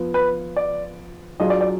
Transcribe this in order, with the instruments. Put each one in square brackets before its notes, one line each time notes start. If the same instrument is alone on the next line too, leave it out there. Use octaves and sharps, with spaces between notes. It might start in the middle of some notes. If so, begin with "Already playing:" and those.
Already playing: [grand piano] F3 B3 F4
[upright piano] B4
D5
[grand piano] F#3 D4 F4 G#4 [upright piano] D#5
[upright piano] D5
D5